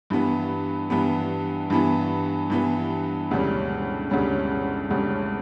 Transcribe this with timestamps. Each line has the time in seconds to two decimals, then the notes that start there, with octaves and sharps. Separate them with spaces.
0.10 G2 E3 B3
0.90 G2 E3 B3
1.70 G2 E3 B3
2.50 G2 E3 B3
3.31 E1 D2 C#3 G3 C#4
4.10 E1 D2 C#3 G3 C#4
4.90 E1 D2 C#3 G3 C#4